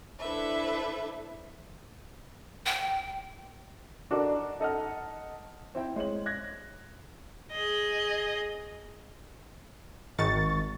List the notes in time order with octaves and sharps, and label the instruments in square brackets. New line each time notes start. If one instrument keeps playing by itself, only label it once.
[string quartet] D4 E4 A4 B4 C5 E5
[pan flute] G5
[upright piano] D4 D#4 F#4 A4 A#4 D5
D#4 A4 D#5 F#5 F6
C4 E4 G5
G#3 C5 C#5 F#7
F#6 G#6 A#6
[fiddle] G#4 D#5
[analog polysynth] G#1 D#3 C#6 A6